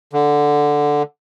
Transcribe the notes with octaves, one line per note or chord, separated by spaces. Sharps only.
D3